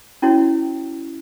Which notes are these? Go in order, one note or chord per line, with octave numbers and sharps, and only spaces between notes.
C#4 E4 F#4 C#5